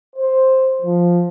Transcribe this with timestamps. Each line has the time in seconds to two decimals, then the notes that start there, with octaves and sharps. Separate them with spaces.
0.16 C5
0.82 F3